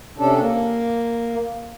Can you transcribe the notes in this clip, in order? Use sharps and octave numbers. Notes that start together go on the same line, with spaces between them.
C3 C#4 D4 A4
A#3